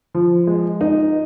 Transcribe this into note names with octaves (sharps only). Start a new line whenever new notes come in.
F3
G#3
D#4